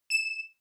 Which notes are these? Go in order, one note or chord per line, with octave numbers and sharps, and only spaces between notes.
E7